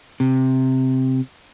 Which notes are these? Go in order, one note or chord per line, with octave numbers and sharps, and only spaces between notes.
C3